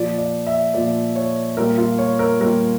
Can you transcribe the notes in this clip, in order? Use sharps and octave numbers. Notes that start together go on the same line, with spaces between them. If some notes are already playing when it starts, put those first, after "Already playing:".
Already playing: A#2 F3 D5
D5
E5
A#2 F3 D5
C#5
A#2 G3 A#4
F4
C#5
A#4
A#2 G3 A#4